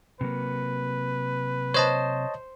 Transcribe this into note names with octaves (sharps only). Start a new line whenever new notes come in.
C3 F#3 A#3 B4
C5 C#5 D#5 A5